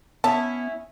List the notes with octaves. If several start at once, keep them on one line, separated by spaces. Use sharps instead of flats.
B3 C#4 E4 A5